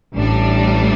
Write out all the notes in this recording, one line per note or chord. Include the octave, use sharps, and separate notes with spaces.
A1 A2 G3 D4